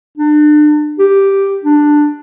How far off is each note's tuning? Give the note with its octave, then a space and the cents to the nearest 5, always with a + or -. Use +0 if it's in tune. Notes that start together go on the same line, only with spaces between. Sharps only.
D4 +35
G4 +0
D4 +10